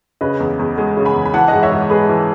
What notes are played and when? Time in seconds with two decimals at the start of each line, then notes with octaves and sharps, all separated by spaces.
0.21 C#3 B4 D#5
0.40 E2
0.59 E2
0.78 G#3
0.97 C#3
1.05 G#5 B5
1.15 E2
1.25 B5
1.34 E3 F#5 A5
1.48 G#2 D#5 F#5
1.63 C#5 E5
1.71 G#2
1.90 G#3 G#4 B4
2.09 E3